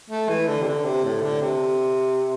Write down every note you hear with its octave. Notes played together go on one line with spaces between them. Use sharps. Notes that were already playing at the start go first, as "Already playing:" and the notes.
A3
E3
D3
C3
D3
C3
A2
D3
C3